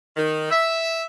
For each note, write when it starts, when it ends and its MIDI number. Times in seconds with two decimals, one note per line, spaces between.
0.17 0.50 51
0.51 1.04 76